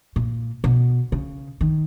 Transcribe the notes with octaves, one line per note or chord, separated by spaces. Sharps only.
A#2
B2
C#3
D#3